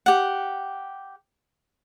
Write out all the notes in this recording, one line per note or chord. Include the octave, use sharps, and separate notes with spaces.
G4 F#5